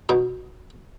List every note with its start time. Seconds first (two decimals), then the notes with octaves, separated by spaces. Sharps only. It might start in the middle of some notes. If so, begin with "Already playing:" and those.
0.09 B2 D#4